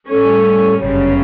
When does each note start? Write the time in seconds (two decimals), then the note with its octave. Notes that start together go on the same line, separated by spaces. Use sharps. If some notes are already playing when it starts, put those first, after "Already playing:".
0.10 A2 G3 C#4 A4
0.81 G1 F#2 C#3 G3 C#5